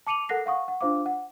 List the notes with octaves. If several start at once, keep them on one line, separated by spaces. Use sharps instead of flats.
A5 D6 C#7 D#7 F7 F#7
A4 A#4 F#5 F#6 A#6 C7
F5 F#5 C#6 D#6
F#5
D4 F4 C5 F5 D6
F#5